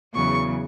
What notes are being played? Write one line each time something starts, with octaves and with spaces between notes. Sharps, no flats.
E2 C#3 F#3 C#6